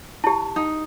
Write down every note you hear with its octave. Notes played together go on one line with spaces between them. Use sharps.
E4 G4 A5
D#4